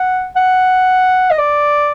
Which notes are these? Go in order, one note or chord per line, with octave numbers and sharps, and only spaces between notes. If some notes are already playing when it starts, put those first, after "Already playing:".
Already playing: F#5
F#5
D#5
D5